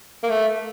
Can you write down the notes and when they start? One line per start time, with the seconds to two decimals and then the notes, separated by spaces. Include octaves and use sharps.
0.23 A#3
0.29 A3